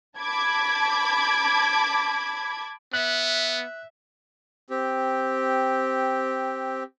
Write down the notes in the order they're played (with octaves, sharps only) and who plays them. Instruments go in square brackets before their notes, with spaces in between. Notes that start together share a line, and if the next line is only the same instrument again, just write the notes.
[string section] A5 B5 D6 G#6
[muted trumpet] B3 [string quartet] E5 [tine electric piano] F#6
[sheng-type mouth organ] C4 G4